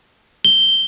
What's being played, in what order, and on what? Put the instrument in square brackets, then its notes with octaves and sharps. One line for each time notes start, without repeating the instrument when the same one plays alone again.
[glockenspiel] G7